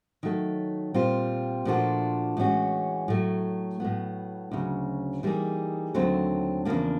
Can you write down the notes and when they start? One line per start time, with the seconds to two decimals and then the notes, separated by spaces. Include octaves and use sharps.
0.23 D#3 F#3 A3
0.94 A#2 G3 C4 F4
1.65 A#2 F3 A3 D4 F#4
2.37 A2 E3 G#3 C#4 F#4
3.08 A2 F#3 A3
3.80 A2 F#3 B3
4.52 D2 C#3 F#3
5.23 E3 G3 A#3 D#4 G#4
5.94 D#2 D3 F#3 A3 C4
6.65 E2 C#3 F3 A#3 D4